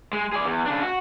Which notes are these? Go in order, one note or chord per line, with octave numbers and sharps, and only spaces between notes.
G#3
G#4 D5
E2
C#3 D4
F#4